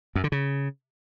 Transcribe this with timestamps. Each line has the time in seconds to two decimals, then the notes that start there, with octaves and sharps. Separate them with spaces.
0.15 F#2
0.24 D3
0.32 C#3